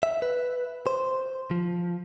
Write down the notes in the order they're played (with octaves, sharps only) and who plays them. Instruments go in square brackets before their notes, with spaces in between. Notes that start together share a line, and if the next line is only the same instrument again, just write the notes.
[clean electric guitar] E5
B4
C5
F3